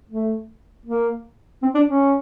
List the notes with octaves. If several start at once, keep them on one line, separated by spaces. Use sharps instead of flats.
A3
A#3
C4
D4
C#4